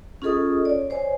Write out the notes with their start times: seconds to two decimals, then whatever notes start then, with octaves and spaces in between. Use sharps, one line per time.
0.22 C#4 F4 G#4 A4 D#5 D#6
0.65 C#5 D5
0.90 C5 C#5 D#5 G#5